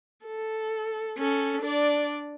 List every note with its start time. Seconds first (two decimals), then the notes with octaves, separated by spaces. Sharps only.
0.24 A4
1.18 C#4 A4
1.62 D4 D5